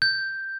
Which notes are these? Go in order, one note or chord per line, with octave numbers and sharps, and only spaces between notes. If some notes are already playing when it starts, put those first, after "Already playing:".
G6